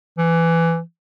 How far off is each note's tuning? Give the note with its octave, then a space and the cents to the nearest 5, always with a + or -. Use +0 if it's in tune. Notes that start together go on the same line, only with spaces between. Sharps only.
E3 +15